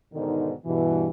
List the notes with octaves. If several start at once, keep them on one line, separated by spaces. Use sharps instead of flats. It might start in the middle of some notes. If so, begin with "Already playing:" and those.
G#2 B2 D3 D#3
G2 B2 E3